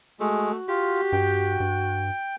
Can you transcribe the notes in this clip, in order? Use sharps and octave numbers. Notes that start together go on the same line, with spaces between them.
G#3 A3 F#4
F4 G4
G2 G5
G2